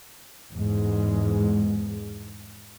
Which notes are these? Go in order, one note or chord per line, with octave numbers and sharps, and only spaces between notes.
E2 G#2 G#3